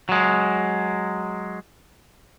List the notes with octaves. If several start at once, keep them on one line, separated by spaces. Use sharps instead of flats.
F#3 G#3